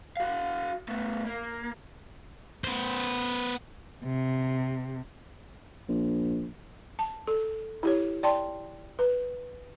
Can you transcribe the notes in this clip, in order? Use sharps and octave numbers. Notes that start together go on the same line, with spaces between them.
F#4 F5
A3 B3
A#3
B3 C5
C3
A#1
A5
A4
E4 G4 C#5
D5 G5 A5 C6
B4